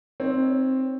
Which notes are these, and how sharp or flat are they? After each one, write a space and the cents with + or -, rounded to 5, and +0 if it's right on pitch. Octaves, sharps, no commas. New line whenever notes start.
C4 +5 D#4 +0 C#5 +0